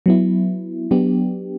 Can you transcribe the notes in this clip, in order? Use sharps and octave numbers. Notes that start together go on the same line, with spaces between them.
F#3 B3 E4
F#3 B3 D4 G4